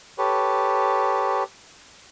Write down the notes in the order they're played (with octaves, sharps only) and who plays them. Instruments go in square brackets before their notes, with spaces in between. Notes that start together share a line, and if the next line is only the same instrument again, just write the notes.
[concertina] G4 A4 B4 C#5